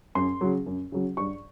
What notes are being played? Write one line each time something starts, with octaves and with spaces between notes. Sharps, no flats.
F#2 C6
C#3 F#3
F#2
C#3 F#3
G2 C#6